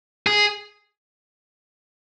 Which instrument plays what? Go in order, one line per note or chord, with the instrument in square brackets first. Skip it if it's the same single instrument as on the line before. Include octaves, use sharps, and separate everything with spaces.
[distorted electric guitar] G#4